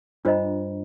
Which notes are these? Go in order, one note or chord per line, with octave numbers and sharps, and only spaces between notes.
G2 D4 F4 C5 D#5 A#5